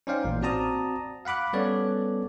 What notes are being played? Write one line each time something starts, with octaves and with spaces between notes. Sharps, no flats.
C#4 D#4 C5 D5 F5 G5
A1 A#2
C4 F#4 D5 A5 A#5 D#6
F5 F#5 B5 D6 F#6
G3 B3 C#4 A4 C#5 D5